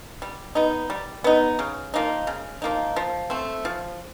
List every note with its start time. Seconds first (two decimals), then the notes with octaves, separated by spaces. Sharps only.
0.22 G3
0.55 B3 D#4
0.90 G3
1.24 B3 D#4
1.59 C#3
1.94 F3 A#3 D#4
2.27 C#3
2.62 F3 A#3 D#4
2.96 F3
3.30 A3 C4
3.65 F3